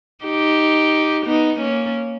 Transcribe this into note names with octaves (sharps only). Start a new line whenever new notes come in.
D#4 G4
B3 D#4
A#3 C#4